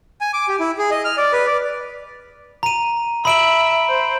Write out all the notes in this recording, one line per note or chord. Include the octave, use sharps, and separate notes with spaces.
G#5
D6
G4
E4
G#4
D#5
F6
D5
B4
D5
A#5 D#7
E5 B5 D7 F#7
C5